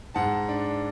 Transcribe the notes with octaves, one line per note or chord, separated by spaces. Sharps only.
G#2 F#5 A5
D4